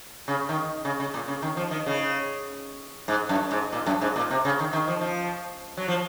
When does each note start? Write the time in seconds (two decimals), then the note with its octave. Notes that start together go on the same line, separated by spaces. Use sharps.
0.28 C#3
0.49 D#3
0.85 C#3
1.00 C#3
1.14 A#2
1.28 C#3
1.42 D#3
1.57 F3
1.71 D#3
1.86 C#3
3.08 G#2
3.29 F#2
3.51 G#2
3.72 A#2
3.86 F#2
4.01 G#2
4.16 A#2
4.30 C3
4.45 C#3
4.59 D#3
4.73 D#3
4.88 F3
5.01 F3
5.77 F#3
5.88 F3